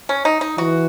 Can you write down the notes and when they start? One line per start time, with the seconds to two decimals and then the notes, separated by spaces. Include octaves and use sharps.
0.09 C#4
0.25 D#4
0.41 D#4
0.58 E3 F#4